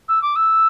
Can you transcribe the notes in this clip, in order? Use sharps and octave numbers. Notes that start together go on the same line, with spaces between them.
E6
D6
E6